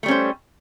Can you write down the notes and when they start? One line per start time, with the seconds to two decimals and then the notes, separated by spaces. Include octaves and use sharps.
0.03 A3
0.06 G3
0.08 C#4
0.11 C5